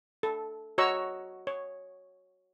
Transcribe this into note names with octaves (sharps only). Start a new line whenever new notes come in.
A4
F#4 C#5 D#5 A#5 C#6 E6
C#5